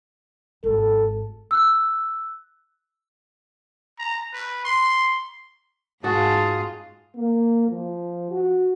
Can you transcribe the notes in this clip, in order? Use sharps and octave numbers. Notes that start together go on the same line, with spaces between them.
G#1 A4
E6 F#6
A#5
B4
C6
G#2 F4 F#4 G#4 A5
A#3
F3
F#4